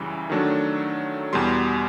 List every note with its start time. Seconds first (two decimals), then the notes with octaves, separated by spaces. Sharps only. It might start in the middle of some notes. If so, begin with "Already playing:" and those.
Already playing: F#2 C#3 E3 G3
0.30 D#3 F#3 A3 D4
1.33 E2 B2 G3 C6